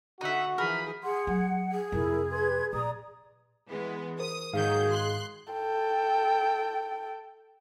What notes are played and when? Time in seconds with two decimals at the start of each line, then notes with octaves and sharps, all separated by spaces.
0.21 D3 D#4 F#4 E5 F#5
0.58 E3 F3 G#4 A#4 B5
1.03 G#4 F#5 C6
1.27 F#3 F#5
1.72 G#4
1.92 F2 C3 E4 A#4
2.31 B4 C6 G#6
2.73 A#2 D5 A#5 D#6
3.69 E3 G#3 B3
4.20 A#4 C5 D#6
4.53 G#2 D#3 F#3 G#4 F5 G6
4.91 C6 F#6
5.53 A4 G5